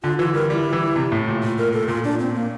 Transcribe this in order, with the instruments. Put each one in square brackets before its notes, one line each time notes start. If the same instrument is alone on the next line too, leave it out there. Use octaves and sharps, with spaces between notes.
[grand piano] D3 [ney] F4
[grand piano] E3 [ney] F4
[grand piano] G3 [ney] A#4
[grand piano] G3 [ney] F4
[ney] E4
[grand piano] E3
C3
A2
A#2
[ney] F4
A#4
A4
[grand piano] A#2 [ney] F4
[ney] D4
C4
A#3